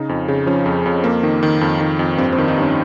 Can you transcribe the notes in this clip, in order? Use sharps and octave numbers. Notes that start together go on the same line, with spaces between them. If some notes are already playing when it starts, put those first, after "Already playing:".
Already playing: C#3 D#4
F2
C#3
F3 C#4
F2
F2
F2 A#3
D#3
D#3
F2
D#3
F2
G2 C4
C4
D#3
D#4
G2 C#4